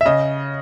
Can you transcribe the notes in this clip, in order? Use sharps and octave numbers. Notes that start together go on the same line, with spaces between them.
E5
C#3 D#5